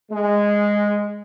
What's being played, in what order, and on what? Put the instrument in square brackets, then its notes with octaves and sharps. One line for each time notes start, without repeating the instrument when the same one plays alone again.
[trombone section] G#3